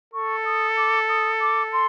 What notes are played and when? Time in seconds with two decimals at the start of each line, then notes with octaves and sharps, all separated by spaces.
0.14 A4 C#6
0.45 D#6
0.77 D6
1.09 D#6
1.41 D6
1.73 C6